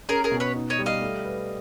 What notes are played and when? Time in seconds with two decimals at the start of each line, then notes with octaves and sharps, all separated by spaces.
0.09 C#4 G#4 A#4
0.24 G#4 A#4
0.31 B2
0.40 B4 C#5
0.55 D#4
0.70 C#5 D#5
0.79 G3
0.86 D#5 F5
1.01 A3
1.25 B4